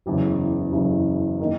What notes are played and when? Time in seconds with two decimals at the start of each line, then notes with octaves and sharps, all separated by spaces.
0.06 F#1 E2 C#3
0.72 F#1 E2 C#3
1.39 D#3 A#3 D#4